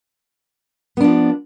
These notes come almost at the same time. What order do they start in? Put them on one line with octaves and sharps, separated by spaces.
B3 D4 F3